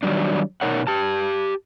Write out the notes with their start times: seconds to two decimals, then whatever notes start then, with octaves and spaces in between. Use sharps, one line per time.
0.03 D#3 F#3 G3 D4
0.61 B2 F#3 D#4 A#4 C#5 F#5
0.87 G4 A5